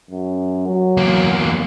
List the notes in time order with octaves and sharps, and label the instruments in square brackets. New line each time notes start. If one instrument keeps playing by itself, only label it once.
[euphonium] F#2
F#3
[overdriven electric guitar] E2 A#3